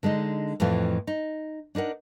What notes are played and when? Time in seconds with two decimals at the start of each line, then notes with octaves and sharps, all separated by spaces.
0.03 D3 G#3 D4 D#4
0.60 F2 A2 E3 A3 F4
1.07 D#4
1.75 D4 D#4 A#4 F#5